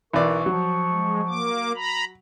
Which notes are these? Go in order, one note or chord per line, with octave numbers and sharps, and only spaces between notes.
B1 E3 A#4 D5 C#6
F3 F#3
G#3
A#3 D6
A#5 B5